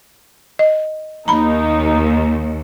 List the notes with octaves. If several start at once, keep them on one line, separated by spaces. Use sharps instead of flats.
D#5
D#2 D#4 A#5 B5